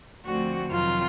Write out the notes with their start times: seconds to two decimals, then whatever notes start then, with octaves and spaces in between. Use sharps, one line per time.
0.25 D2 D3 F3 A3 C4 F#4
0.71 F2 C3 D#3 F#3 F4